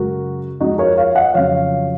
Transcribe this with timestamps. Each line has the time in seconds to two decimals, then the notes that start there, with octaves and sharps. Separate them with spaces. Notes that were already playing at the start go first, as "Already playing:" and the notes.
Already playing: F#2 C#3 G#3 F#4 A#4
0.60 F2 F3 G#3 D#4 F#4
0.78 A#4 C#5
0.98 C#5 F5
1.15 D#5 F#5
1.34 F2 C#3 F#3 C#5 F5